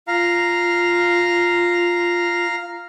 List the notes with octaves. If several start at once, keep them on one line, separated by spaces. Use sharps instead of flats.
F4 F5 A#5